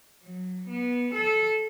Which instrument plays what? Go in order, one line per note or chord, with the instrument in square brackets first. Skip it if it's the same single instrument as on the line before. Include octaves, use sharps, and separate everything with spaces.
[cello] F#3
B3
A4